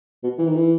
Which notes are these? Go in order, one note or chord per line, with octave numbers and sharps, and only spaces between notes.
B2
E3
D#3
E3